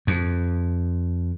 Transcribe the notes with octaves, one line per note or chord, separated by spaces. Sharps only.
F2